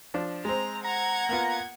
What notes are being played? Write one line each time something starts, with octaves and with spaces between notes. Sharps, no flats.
F3 D4
G#3 C4 A#5
F#5 A#5 G#6
A#3 B3 F4